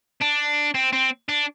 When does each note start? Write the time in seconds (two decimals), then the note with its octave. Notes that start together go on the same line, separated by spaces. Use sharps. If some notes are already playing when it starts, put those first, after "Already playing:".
0.21 D4
0.75 C4
0.93 C4
1.29 D4